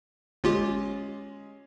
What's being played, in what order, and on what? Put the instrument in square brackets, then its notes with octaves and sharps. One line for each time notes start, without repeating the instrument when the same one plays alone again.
[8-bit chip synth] G1 F4 G4 [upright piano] G#3 C#4